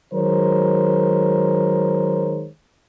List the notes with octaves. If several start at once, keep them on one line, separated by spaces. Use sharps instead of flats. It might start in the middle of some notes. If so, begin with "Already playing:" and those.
D#3 F#3 G#3 A#4 C5 C#5